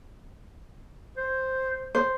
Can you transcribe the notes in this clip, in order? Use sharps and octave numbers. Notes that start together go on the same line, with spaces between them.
C5
C5